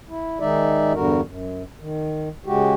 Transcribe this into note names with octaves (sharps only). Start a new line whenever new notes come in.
E4
D#3 G#3 D#4 D5 E5
E2 G2 D3 G3 F#4 A#4
F#2
D#3
C#3 G#3 F#4 G4